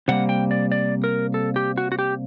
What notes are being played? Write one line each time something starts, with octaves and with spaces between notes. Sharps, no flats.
C3 G3 A#3 F#5
G5
D5
D5
A#4
A4
G4
F#4
F#4
G4